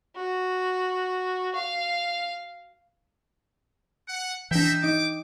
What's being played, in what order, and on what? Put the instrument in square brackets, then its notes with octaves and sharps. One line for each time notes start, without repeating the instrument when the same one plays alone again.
[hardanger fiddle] F#4
F5
[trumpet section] F#5
[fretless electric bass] E3 D4 [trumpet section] D#4 E5 [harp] G5
[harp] D#4 [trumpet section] D6